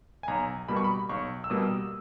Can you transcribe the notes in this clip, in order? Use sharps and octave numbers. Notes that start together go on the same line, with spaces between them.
G#5
B1 A#5
B2 G3 A#3 B5
C#6
B5
B1 C#6
E6
B2 G3 A#3 D#6